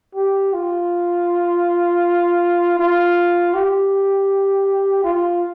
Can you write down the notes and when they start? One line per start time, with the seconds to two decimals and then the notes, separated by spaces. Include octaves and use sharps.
0.15 G4
0.54 F4
2.79 F4
3.54 G4
5.04 F4